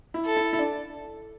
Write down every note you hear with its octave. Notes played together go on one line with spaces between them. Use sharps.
E4
A4
E4
E4
D4